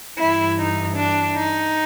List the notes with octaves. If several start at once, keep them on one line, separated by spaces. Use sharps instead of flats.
G2 E3 E4
D#4
D4
D#4